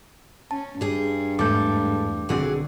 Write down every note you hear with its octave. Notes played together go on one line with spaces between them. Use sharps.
C#4 A5
G2 G3 G#4
E2 G#2 A3 A4 D6 G6
B1 D3 C4 F#4 G#4 D5